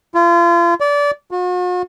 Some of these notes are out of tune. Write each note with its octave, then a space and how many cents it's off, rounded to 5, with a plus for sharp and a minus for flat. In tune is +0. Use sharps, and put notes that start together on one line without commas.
F4 -35
D5 -25
F#4 -45